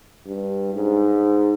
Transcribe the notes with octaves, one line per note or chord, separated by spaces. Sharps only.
G2
G#2